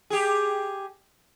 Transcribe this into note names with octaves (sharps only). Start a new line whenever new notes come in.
G4 G#4